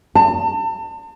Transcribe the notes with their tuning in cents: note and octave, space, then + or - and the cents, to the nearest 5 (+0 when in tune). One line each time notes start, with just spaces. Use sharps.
A5 +35